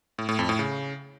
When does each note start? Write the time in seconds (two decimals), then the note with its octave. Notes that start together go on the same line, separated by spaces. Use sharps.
0.18 A2
0.29 A2
0.39 F2
0.49 A2
0.59 C#3